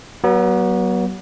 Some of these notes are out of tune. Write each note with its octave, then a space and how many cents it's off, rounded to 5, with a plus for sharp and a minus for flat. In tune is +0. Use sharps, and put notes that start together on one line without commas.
F#3 +30 B3 -30